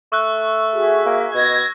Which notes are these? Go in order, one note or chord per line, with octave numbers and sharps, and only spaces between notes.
A3 C#6 E6 F#6
F#4 G#4 E5
A#3
B2 D#5 G#6 A#6